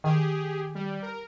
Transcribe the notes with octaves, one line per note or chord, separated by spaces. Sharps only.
D#3 G4 G#4
G3
A#4